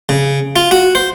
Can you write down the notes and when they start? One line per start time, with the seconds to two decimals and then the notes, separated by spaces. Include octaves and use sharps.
0.09 C#3
0.56 F4
0.71 F#4
0.95 C5